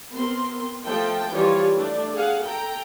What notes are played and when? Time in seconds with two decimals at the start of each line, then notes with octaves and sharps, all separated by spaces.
0.15 B3 C4 A#4 C6
0.85 F3 A3 G5 A5
1.33 E3 F3 G3 F4 G4 C#5
1.75 A3 D4
2.14 G#4 F5 F#5
2.45 A4 G5 A#5